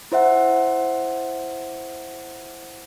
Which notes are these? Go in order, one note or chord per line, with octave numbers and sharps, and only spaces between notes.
E4 C5 E5 F#5